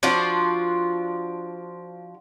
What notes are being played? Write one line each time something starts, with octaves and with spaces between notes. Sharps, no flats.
F3 D4 F4 F#4